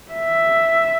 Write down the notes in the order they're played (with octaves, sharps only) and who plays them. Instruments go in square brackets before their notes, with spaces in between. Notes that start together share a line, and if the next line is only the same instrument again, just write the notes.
[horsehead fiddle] E5